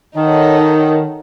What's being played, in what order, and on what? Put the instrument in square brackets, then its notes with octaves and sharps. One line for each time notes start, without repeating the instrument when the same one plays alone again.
[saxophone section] D#3 [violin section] D#4 A4 C#5 F#5